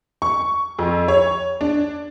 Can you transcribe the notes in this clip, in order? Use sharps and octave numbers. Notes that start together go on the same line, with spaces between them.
C#6
F2
C#5
D4